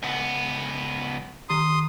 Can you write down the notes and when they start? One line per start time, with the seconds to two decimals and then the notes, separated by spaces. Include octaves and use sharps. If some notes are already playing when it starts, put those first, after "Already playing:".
0.03 C#2 B3
1.49 D#3 G4 A#5 C6 D#6